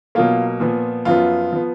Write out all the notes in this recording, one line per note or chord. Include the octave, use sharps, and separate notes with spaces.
B2 F#3 A#3 F4
A#2 F3 B3
F#2 F3 B3 F4
F3 B3